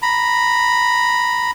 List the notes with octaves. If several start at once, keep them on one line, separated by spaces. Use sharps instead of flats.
A#5 B5